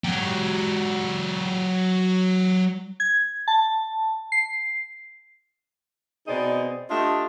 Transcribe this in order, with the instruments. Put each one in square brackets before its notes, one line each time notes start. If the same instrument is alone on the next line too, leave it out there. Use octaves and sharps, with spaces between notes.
[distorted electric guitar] F#3 G4
[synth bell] G#6
A5
C7
[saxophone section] B2 C4 D#4 G#4 D5 D#5
A3 D4 F4 G4 D#5 E5